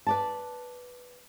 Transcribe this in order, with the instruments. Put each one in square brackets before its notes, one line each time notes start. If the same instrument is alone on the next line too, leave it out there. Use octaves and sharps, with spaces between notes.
[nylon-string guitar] B4 D5 A5